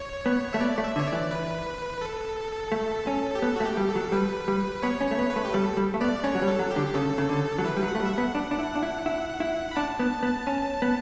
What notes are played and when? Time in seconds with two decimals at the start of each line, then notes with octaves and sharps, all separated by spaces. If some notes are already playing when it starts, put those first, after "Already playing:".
Already playing: C#5
0.26 B3
0.53 A3 E5
0.60 B3 D5
0.78 A3
0.84 E5
0.96 D3
0.99 C#5
1.07 D5
1.13 E3
1.31 B4
2.01 A4
2.72 A3
3.07 C#4
3.35 G4
3.42 B3 A4
3.56 F#4
3.60 A3
3.65 G4
3.77 G3
3.89 A4
3.95 F#3
4.12 G3 B4
4.48 G3
4.82 B3 C#5
5.01 C#4
5.07 A3 C#5
5.19 B3
5.30 B4
5.36 A3
5.45 G4
5.54 G3 A4
5.77 G3
5.94 A3
6.01 B3 D5
6.24 C#4 C#5
6.35 F#3
6.42 G3
6.48 A4
6.59 F#3
6.71 G4
6.76 D3
6.94 C#3 A4
7.18 C#3
7.29 D3
7.58 F#3
7.64 E3 B4
7.77 G3
7.83 F#3
7.88 F#5
7.95 A3
8.00 G3
8.05 E5
8.12 F#5
8.18 B3
8.35 D4
8.51 D4
8.59 E4
8.75 D4
8.83 E4
9.06 E4
9.40 E4
9.71 B5
9.76 D4 A5
9.99 B3
10.23 B3
10.47 C#4
10.82 B3